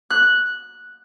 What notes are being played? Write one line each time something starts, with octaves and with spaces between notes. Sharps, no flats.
F#6